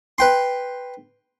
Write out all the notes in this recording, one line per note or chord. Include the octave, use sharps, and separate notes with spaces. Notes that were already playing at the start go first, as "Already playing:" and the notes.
B4 G5 C6